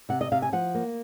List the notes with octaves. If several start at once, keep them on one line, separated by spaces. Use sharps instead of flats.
C3 F#5
D#5
C3 F5
G#5
F3 F#5
A#3